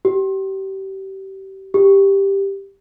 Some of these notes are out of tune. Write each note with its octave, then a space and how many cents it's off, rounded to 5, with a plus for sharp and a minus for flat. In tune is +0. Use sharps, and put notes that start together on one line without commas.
G4 -30
G4 +5